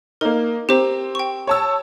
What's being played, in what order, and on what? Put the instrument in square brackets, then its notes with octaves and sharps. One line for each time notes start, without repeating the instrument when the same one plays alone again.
[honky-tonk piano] A#3 D#4 [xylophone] A#4
[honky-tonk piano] C4 [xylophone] G4 C5 A#5
[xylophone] G5 C#6
[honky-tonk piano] C#5 A5 E6